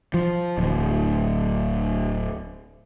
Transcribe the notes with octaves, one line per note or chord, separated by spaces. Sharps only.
F3
D1